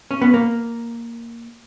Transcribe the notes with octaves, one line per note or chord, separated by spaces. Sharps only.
C#4
B3
A#3